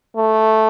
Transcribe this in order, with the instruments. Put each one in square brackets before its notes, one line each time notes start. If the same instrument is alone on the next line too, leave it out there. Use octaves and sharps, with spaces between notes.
[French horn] A3